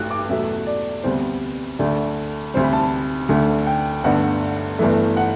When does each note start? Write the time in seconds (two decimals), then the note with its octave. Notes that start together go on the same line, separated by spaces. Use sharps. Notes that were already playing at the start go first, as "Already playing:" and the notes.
Already playing: A1 G2 F#3 A3 F#6
0.10 D6
0.29 E2 B2 F#3 A3 E5
0.67 D5
1.04 D2 C3 G3 B3 C5
1.79 D2 D3 A3 D5
2.54 D2 C3 G3 C5
2.63 B5
2.73 A5
3.29 D2 D3 A3
3.67 G5
4.04 G1 G2 D3 A3 F#5
4.79 G1 G2 E3 A3
5.17 F#5